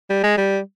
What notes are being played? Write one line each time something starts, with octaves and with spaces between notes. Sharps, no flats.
G3
G#3
G3